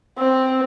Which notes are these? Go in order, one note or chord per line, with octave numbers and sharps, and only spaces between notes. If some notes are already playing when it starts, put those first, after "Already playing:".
C4